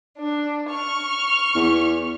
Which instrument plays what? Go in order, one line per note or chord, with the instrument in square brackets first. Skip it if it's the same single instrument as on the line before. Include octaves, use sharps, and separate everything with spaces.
[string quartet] D4
C#6 F6
[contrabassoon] E2